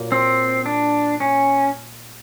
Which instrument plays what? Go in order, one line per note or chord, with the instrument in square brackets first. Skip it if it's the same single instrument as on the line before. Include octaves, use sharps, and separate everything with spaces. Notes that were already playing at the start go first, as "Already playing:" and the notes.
Already playing: [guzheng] A#2 F#3 A#3
[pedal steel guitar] C4
D4
C#4